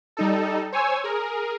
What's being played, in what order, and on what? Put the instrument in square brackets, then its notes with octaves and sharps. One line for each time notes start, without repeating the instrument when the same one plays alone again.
[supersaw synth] G3 D#4 A4
C5 C#5 G#5 E6
G#4 A#4